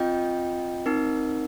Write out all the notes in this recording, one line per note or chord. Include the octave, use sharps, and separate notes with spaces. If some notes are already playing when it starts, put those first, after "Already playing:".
Already playing: C4 F4 D#5 G5
C4 D#4 A#4